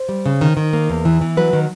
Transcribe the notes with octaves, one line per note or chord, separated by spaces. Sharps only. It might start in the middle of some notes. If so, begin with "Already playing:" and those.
Already playing: C5
G3
C#3
D#3
D#3
A#3
E2
E3
E3
F#3 B4
D#3